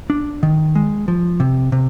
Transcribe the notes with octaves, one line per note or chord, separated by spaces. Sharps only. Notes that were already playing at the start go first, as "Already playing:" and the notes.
D4
D#3
G#3
F3
C3
C3